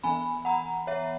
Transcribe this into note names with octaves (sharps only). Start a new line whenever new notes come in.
E3 B3 G#5 B5
F#5 A#5
C#5 E5